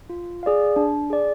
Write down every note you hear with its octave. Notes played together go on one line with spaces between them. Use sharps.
F4
G#4 D5 F5
D4
G#4 D5